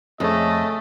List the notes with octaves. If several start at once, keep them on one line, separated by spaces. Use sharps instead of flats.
F2 C#3 A3 D#5